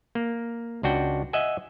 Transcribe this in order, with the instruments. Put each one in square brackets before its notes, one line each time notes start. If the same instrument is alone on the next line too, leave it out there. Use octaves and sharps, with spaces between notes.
[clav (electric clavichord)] A#3
C#2 D4 F#4 G5
D#5 E5 F#5 G#5